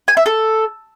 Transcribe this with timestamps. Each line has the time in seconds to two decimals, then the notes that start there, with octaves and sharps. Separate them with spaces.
0.08 G#5
0.17 E5
0.26 A4